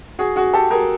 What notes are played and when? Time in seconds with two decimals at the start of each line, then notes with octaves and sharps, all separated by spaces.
0.19 F#4 G#4
0.36 F#4 G#4
0.53 G4 A4
0.71 G#4 A#4